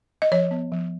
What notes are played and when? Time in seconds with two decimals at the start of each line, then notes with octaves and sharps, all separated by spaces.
0.22 D#5
0.32 F3 C#5
0.51 B3
0.72 F3